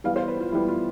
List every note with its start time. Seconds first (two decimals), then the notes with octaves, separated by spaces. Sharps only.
0.04 E3 G3 B3 F5
0.16 C5
0.28 B4
0.40 F4
0.52 E3 G3 B3 E4
0.68 F4